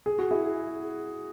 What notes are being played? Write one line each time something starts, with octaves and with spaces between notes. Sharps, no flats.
G#4
F#4
E4 G#4